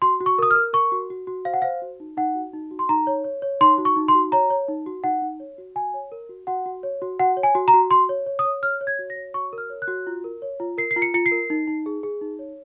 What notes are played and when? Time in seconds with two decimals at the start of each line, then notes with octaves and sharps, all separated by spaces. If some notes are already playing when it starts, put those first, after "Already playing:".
0.02 F#4 C6
0.20 F#4
0.26 C#6
0.39 A#4 D#6
0.51 F6
0.55 A#4
0.73 A#4 C#6
0.92 F#4
1.10 F#4
1.27 F#4
1.45 C5 F5
1.54 F#5
1.62 C5 F5
1.82 F#4
2.00 D#4
2.17 D#4 F#5
2.35 F#4
2.53 D#4
2.71 F#4
2.79 C6
2.89 D#4 A#5
3.07 C#5
3.24 C#5
3.42 C#5
3.61 D#4 C6
3.78 F#4
3.85 C#6
3.96 D#4
4.08 C6
4.15 F#4
4.32 C#5 A#5
4.50 C#5
4.68 D#4
4.86 F#4
5.04 D#4 F#5
5.22 D#4
5.40 C#5
5.58 F#4
5.76 F#4 G#5
5.94 C#5
6.12 A#4
6.29 F#4
6.47 F#4 F#5
6.66 F#4
6.83 C#5
7.02 F#4
7.19 F#4 F#5
7.37 C#5
7.43 G#5
7.55 F#4
7.68 A#5
7.74 F#4
7.91 F#4 C6
8.09 C#5
8.26 C#5
8.39 D#6
8.45 C#5
8.63 C#5 F6
8.81 C#5
8.87 G#6
8.99 F#4
9.10 A#6
9.16 C#5
9.34 F#4 C#6
9.53 A#4
9.58 F6
9.70 C#5
9.82 F#6
9.88 F#4
10.07 F4
10.24 A#4
10.42 C#5
10.60 F4
10.78 A#4 C7
10.91 C7
10.96 F4
11.02 C#7
11.14 F4 C#7
11.26 C7
11.32 A#4
11.50 D#4
11.67 D#4
11.86 G#4
12.03 G#4
12.21 D#4
12.39 C#5